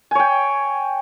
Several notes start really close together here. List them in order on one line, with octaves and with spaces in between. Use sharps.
G#5 C#5 G5